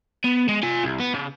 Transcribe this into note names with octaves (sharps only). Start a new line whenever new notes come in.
B3
G#3
F4 G#5
C2
B3
C#3